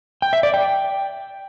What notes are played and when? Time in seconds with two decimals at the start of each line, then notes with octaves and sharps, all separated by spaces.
0.22 G5
0.33 E5
0.43 D5
0.54 G5